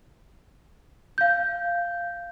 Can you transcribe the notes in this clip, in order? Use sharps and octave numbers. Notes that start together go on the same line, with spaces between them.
F5 G6